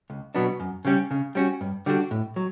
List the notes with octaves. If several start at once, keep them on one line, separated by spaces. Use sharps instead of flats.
C#2
B2 F#3 B3 D4
F#2
C#3 G3 C#4
C#3
G3 C#4 F#4
G2
D3 G3 D4 F#4
A2
F#3